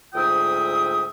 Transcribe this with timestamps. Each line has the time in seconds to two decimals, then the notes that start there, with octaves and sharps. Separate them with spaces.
0.15 D2 G#2 F4 E5 G5 D#6